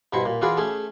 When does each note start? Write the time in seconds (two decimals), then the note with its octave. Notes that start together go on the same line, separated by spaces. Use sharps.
0.13 G2 B2 E4 C5 C#6
0.26 A#2
0.42 E3 F4 F#4 G#4 B4 D5
0.57 A3 C#4 G#4 E5